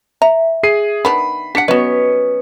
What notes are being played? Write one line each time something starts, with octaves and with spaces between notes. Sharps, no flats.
E5 A#5
G#4 C7 D#7
D#3 B3 D4 B5
D4 G4 F#5 B6 C#7
B3 C#4 F#4 B4 D#5